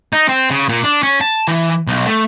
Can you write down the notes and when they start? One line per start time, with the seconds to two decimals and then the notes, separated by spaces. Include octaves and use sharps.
0.13 D#4
0.29 C4
0.51 C#3
0.69 A#2
0.84 D4
1.03 C#4
1.21 A5
1.48 E3
1.87 B1
2.07 A3